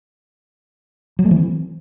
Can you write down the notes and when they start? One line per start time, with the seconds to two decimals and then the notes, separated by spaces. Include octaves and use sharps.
1.19 F#3
1.25 A3
1.31 E3
1.37 C4